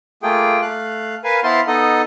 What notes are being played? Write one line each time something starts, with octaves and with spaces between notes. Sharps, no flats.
A3 A#3 F4 G#4 G5
A3 F5 F#6
A#4 B4 F5 G#5
B3 E4 C5 F5 A5 C6
B3 D#4 A4 D#5